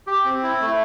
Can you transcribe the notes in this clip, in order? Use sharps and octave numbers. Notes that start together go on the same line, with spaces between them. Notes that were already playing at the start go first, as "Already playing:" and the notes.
G4
C4
E4
A3